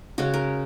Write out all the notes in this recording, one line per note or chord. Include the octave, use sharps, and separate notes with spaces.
C#3 G#3 C#4 F#4
A#4